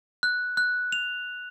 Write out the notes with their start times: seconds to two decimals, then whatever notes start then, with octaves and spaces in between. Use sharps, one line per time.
0.23 F#6
0.57 F#6
0.92 F7